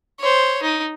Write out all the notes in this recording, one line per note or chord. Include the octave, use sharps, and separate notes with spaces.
C5 C#5
D#4